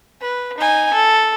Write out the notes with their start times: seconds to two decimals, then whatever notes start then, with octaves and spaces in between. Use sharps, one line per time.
0.21 B4
0.57 D#4 G#5
0.93 A4